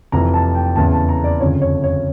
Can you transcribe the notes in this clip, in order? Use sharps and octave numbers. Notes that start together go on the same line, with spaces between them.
F1 F2 E3 A#5
A5
G5
E2 C#3 E3 A5
A5
A#5
D5
G1 F2 C#3 C#5
C#5
C#5